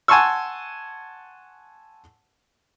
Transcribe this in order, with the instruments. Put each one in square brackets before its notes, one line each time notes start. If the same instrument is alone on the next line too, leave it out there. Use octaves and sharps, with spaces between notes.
[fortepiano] F#5 G#5 A5 C6 C#6 E6